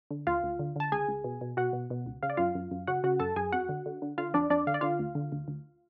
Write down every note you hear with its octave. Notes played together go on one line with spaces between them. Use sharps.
D3
D2 F4 F5
D2
D3
D3 A5
C#2 G#4 G#5
C#2
B2
B2
B2 F#4 F#5
B2
B2
C#2
C#3 F5
D5
F#2 F4 F5
F#2
F#2
C#3 F#4 F#5
C#3 F#4 F#5
F#2 A4 A5
F#2 G#4 G#5
F2 F#4 F#5
D3
D3
D3
D3 F4 F5
F2 D4 D5
F2 D4 D5
D3 F5
D5
D3 F4 F5
D2
D3
D2
D2